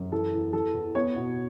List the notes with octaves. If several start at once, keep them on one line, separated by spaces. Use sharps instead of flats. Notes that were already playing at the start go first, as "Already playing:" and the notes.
Already playing: F#2
E3 A4
E2
E3 A4
E2
B3 C#5
B2